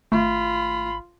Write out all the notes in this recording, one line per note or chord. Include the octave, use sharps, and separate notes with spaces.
G#1 A3 F4 B5